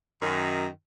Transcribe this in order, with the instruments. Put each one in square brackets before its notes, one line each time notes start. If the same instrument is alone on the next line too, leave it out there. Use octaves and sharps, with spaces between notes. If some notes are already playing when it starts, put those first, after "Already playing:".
[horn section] F#2 D#3